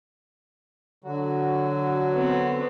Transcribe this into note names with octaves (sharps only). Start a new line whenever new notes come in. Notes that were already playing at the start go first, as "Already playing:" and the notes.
D3 F#3 F#4
B3 C4